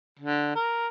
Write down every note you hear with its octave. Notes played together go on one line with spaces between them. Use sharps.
D3
A#4